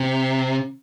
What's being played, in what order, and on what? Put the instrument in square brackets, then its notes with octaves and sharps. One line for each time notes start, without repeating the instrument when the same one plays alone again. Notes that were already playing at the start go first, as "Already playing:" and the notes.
Already playing: [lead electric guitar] C3